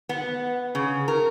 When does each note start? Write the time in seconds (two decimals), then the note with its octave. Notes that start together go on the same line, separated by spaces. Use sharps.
0.09 B3
0.75 C#3
1.08 A#4